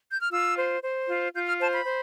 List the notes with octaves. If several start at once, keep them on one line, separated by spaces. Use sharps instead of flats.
G6
F6
F4 E6
C5
C5
F4
F4 G6
F6
C5 A5
B5
C5